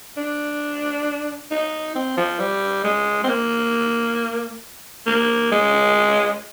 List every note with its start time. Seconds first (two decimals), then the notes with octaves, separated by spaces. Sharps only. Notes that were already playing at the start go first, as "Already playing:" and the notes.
0.17 D4
1.51 D#4
1.95 C4
2.17 F3
2.40 G3
2.84 G#3
3.24 C4
3.29 A#3
5.07 A#3
5.52 G#3